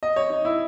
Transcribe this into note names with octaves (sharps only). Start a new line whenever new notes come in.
D#5
C#5
D#4
E4